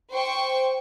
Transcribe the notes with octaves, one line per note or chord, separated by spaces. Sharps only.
C5 G5 C#6